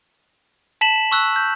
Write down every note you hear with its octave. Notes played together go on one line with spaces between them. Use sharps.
A5 B6 E7 F#7
C#6 E6 F#6
G6